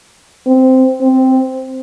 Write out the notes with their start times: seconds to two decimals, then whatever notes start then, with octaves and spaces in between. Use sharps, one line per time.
0.47 C4
1.02 C4